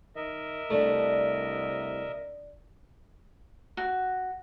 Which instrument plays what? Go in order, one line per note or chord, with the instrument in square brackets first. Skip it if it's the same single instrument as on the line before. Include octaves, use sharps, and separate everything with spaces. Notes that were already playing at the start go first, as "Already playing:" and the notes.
[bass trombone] D#3 [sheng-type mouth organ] A#4 D#5 E5
[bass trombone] C2 [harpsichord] A3 [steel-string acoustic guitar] D4 D5 A5
[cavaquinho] F#4